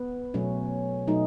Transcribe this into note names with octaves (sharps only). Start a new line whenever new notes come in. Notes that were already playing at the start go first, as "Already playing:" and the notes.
Already playing: B3
B2 F#3 A3 C#4
B2 F#3 A3 D#4